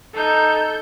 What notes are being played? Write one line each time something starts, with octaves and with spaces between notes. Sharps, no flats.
D#4 A4 G6